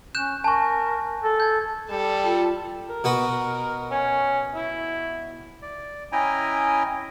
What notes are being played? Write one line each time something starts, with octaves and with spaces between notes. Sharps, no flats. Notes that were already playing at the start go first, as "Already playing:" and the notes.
C#4 F#6 G6 E7
A#4 G#5 A5 C#6
A4
G6 G#6
G3 A4
F4
A#4
B2 F#4 B4
C#4
E4
D5
C#4 E4 D#5 G5 G#5 A#5